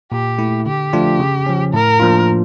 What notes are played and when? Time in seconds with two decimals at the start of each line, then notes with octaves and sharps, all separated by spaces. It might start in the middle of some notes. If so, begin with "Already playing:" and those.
0.12 A#2 G4
0.38 A3 E4
0.66 D3 G4
0.93 F3 A3 D4 F4
1.20 C#3
1.46 F3 C#4
1.74 A2 A#4
2.00 F3 A#3 D4 F4